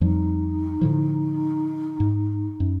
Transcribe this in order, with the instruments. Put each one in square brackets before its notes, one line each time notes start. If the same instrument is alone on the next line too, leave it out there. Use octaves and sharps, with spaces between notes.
[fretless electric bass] F2 F3 G3 [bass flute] D#4
[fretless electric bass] A2 D3 F3
G#2
F#2